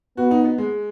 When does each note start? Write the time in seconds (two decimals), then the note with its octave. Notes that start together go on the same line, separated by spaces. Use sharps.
0.17 B3 F#4
0.31 D#4
0.44 B3
0.58 G#3